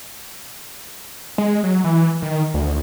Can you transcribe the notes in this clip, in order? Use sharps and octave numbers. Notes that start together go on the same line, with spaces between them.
G#3
F#3
E3
D#3
D2